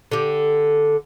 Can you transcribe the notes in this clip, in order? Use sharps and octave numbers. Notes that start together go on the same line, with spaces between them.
D3 G4